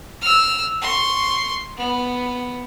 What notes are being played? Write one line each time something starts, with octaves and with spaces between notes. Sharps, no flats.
E6 F6
C6 C#6
B3